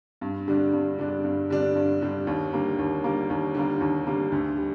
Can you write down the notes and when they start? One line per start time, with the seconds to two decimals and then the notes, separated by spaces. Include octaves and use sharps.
0.21 G2
0.48 D3 G3 D4
0.73 G2
0.98 D3 G3 D4
1.24 G2
1.50 D3 G3 D4
1.75 G2
2.02 D3 G3 D4
2.27 D#2
2.52 D3 G3 A#3
2.79 D#2
3.04 D3 G3 A#3
3.30 D#2
3.54 D3 G3 A#3
3.81 D#2
4.07 D3 G3 A#3
4.32 D2
4.57 G3